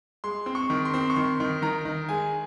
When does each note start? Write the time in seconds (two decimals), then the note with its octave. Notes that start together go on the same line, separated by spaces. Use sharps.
0.24 G#3 C6
0.46 C4
0.55 C#6
0.70 D#3
0.85 C6
0.94 C4
1.10 C#6
1.16 D#3 C6
1.40 D#3
1.62 D#3 A#5
1.85 D#3
2.09 G#3 G#5